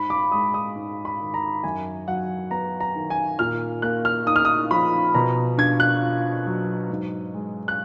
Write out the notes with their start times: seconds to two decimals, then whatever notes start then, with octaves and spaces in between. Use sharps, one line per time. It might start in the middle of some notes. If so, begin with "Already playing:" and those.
Already playing: G#2 B5
0.10 D6
0.32 G#3 D#6
0.54 D#6
0.75 G#2
1.05 B5
1.20 D#3
1.34 A#5
1.64 F#2 G#5
2.07 F#3 F#5
2.51 B3 A#5
2.80 A#5
2.96 D#3
3.10 G#5
3.39 A#2 F6
3.82 A#3 F#6
4.05 F6
4.26 D#4 D#6
4.36 F6
4.45 D#6
4.71 F3 B5
5.14 B2 A#5
5.58 D4 G#6
5.80 F#6
6.02 F4
6.46 F#3
6.90 G#2
7.34 G#3
7.68 F#6